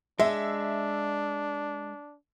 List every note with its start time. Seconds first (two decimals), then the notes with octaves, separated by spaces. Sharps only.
0.20 G#3 D4 E5